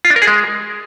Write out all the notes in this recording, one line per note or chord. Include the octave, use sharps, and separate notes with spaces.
F4
D4
A#4
G#4
G#3